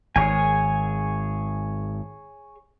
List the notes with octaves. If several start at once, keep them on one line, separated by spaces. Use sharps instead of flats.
G#1 G#4 C#5 G#5